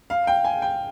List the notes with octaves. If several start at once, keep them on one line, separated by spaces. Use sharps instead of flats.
F5
G5
G#5
G5